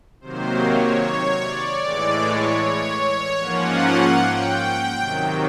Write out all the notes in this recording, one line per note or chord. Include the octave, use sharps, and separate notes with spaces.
C3 D#3 F#3 A#3 C5
C#5
C#5
D5
A2 E3 G#3 D5
C#5
C#5
C#5
G#2 F3 A#3 C#4 F4 F#5
G5
C3 D#3 F#3